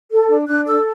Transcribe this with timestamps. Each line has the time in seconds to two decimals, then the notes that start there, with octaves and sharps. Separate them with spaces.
0.11 A4
0.30 D4
0.48 D4 F#6
0.67 A4 E6